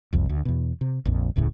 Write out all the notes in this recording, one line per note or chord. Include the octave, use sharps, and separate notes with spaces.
F#1 C2 F2
D2
E2 B2
C3
A#1 F2
E1 C#2 A2 C#3